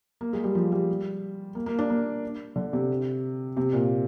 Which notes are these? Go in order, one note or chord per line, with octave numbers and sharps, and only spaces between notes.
A#3
G#3
G3
F3
G3
A#3
A#3
D4
A#3
D3
C3
C3
A#2